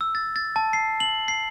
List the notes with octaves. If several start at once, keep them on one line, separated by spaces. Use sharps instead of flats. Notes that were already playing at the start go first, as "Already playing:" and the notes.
E6
A6
A6
A5
C7
F#7
C7